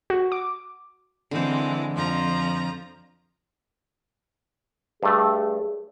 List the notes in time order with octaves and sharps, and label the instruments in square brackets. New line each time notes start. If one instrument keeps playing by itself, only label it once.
[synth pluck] F#4
D6
[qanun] D3 C4 [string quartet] E3 G#3
[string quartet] F2 F3 A#5
[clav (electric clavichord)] G2 A3 [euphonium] G#4